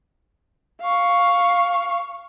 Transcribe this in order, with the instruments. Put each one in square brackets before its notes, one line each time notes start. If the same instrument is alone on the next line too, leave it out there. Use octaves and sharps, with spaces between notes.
[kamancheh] F5 C#6